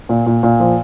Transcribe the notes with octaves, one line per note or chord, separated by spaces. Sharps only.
A#2
A#2
A#2
F3